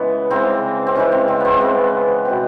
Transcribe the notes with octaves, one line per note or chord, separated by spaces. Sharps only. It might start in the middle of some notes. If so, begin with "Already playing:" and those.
Already playing: C#3 E3 G#3 B3
C#3 E3 G#3 C4
C4
C#3 E3 G#3 C#4
C4
C4
B3 C4
C#3 E3 G#3 B3
B2 G#3 C4